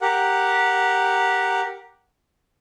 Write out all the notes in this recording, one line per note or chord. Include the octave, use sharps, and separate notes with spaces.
G4 A#4 F#5